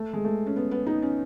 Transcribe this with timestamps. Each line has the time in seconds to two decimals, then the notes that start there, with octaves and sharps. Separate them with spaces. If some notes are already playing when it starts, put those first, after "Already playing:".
Already playing: A3
0.13 G#3
0.25 A3
0.46 C#4
0.56 B3
0.71 B3
0.86 D#4
1.02 C#4